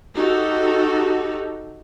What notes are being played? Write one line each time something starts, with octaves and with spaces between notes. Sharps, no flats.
D#4 F#4 G4 A4